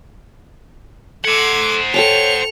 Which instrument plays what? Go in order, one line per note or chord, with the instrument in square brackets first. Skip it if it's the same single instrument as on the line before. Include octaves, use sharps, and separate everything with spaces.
[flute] A4 [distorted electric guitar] C5 F#5 [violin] D6 G#6
[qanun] A4 G5 A5 [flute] C#5 [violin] C#7 F7